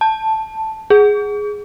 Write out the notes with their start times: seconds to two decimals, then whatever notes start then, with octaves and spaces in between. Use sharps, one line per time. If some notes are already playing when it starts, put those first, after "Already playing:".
0.01 A5
0.90 G#4